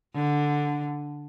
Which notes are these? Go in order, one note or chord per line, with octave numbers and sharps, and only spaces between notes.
D3